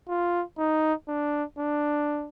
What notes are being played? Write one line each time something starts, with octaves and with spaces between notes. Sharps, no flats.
F4
D#4
D4
D4